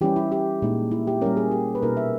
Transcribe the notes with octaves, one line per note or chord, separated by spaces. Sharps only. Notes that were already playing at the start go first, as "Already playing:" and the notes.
E3 G3 C#4 E4 G4
E4
G4
A#2 G#3 D#4
E4
G4
G3 A#3 C#4 A#4
G#4
G4
B4
B2 A#3 D#4 A#4
E5